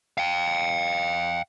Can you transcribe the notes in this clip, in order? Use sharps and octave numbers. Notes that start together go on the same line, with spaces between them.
F5 G5